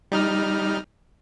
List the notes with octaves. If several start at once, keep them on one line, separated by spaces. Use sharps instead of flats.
G3 D#4 F6